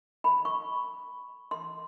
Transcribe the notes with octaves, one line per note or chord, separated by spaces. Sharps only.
B5
C#6
C6